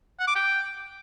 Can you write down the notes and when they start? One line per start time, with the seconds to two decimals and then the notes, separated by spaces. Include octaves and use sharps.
0.20 F#5
0.28 D6
0.36 G5